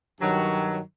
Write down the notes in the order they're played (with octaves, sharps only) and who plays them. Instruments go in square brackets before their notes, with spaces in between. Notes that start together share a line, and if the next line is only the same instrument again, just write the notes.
[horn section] G2 D#3 F#3